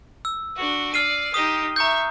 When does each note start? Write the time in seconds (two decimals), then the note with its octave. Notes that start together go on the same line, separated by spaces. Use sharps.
0.25 E6
0.56 D4 F#4
0.94 D5 F6 C7 D#7
1.34 D#4 G4 D#6 G7
1.76 E5 A#5 C#6 G6